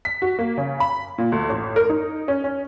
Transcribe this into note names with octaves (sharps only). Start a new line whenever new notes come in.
B6
F#4
A#3
C#3
B5
A#2
D2
A1
A#4
D#4
C#4
C#4